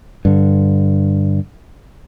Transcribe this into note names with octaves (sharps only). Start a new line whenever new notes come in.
G2 D3